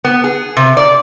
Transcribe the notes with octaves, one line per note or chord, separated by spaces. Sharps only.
B3
G#4
C3
D5